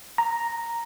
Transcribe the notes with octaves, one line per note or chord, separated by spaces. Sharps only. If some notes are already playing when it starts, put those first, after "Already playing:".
A#5